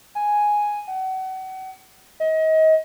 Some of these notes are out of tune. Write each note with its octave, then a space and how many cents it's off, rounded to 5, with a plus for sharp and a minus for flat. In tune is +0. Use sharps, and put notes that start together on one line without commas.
G#5 +0
F#5 +35
D#5 +30